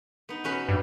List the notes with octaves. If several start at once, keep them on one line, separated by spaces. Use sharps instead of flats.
B3 D#4
B2 C#4 B4
G2